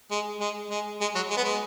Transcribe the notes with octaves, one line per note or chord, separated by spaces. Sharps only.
G#3
G#3
G#3
G#3
F#3
G#3
B3
G#3